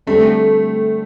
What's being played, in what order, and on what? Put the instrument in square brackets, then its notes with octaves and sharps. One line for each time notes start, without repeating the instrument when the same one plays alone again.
[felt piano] D3 G3 C4 [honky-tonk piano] A3